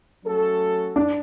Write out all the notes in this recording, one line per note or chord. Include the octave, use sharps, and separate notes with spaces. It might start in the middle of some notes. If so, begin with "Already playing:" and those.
F#3 A3 C#4 F#4 A4
D4